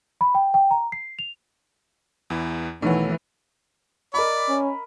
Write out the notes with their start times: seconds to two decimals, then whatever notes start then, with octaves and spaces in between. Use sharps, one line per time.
0.21 B5
0.35 G5
0.54 G5
0.71 A#5
0.92 C7
1.19 F7
2.30 E2 E3 E4
2.82 B1 D#3 E3 A3 C#5 F#5
4.14 A#4 D5 D#5 B5
4.49 C#4